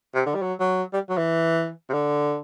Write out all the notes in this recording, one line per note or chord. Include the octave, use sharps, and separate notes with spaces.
C3
D3
G3
F#3
F#3
G3
F#3
E3
C3
D3